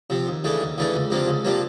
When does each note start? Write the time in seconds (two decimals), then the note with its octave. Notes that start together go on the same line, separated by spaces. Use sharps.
0.10 C3 F3
0.27 D#2
0.44 C#3 E3 A3 D4
0.61 D#2
0.78 C#3 E3 A3 D4
0.94 C#2
1.10 C3 F3 A#3 D4
1.28 C#2
1.45 C3 F3 A#3 D4